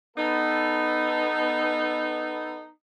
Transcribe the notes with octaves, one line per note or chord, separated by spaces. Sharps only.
B3 D#4 A4